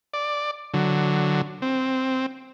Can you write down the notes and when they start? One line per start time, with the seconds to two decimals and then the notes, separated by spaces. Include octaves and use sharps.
0.14 D5
0.74 D3 F#3
1.62 C4